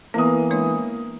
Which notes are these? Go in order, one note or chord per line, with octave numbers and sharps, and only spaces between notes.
E3 A#3 B3 D#6
G#3 D4 C#5